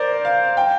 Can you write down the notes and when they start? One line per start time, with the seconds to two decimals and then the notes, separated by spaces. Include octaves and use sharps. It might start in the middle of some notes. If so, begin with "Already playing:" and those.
Already playing: A#4 C5 D5
0.25 F5
0.57 G5